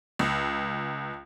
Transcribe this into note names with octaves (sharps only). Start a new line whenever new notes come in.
C#2